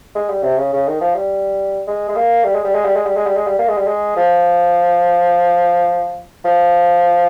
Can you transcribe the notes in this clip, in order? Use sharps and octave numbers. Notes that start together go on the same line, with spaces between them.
G#3
G3
C3
C#3
C#3
D#3
F3
G3
G#3
G#3
A#3
G3
G#3
G3
G#3
G3
G#3
G3
G#3
G3
G#3
G3
A#3
G#3
G3
G#3
F3
F3